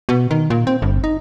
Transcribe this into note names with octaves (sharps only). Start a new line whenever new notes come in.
B2
D#3
A#2
C4
G1
D#4